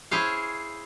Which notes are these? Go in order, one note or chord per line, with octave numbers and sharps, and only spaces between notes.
E4 G#4 C5 C#5 F5